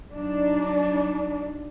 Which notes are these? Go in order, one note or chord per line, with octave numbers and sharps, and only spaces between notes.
F#3 D4 D#4